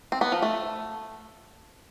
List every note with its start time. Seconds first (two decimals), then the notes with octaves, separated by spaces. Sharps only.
0.12 C4
0.21 B3
0.32 F3
0.42 A3